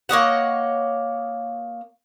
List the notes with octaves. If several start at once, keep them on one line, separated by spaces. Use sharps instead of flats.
A#3 C#5 D#5 F#5